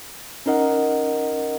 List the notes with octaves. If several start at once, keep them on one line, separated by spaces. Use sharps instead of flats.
C#4 D#4 A#4 D#5 F#5